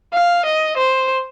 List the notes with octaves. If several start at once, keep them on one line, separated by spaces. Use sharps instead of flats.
F5
D#5
C5